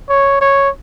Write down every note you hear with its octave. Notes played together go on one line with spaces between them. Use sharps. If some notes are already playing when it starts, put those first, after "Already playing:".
C#5
C#5